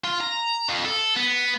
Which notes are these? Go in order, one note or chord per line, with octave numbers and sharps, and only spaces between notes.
F4
A#5
F2
A4
B3